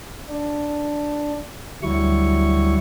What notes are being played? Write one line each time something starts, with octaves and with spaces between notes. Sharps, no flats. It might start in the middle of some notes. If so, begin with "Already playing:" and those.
D4
D2 F#3 G3 E4 C#6